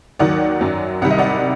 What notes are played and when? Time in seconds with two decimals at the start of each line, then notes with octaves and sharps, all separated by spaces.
0.19 D#2 D#3 F#3 D5 F#5
0.61 F#2 F#3
1.01 C2 C3 D#3 G3 F#5
1.10 D#5
1.18 D5 F#5